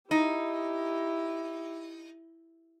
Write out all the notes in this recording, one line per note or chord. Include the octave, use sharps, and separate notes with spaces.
D#4 E4 G4